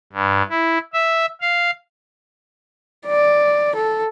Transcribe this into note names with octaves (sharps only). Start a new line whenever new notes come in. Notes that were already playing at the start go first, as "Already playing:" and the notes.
G2
E4
E5
F5
D5
A4